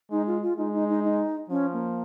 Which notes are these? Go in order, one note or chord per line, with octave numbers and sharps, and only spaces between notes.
G#3 D#4
F4
F4
G#3 D#4
D#4
D#4
D#4
F3 C#4
A#3